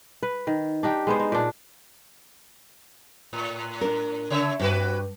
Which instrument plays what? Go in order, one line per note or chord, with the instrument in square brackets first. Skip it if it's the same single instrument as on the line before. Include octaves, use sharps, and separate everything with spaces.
[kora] B4
D#3
D4 D#4 G4
G#3 B3 C5
D#4
A#2 D4
[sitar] A2
[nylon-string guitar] D4 A#4
[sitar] C#3 C#5 E5
[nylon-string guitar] G2 [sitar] C4 F#4 B4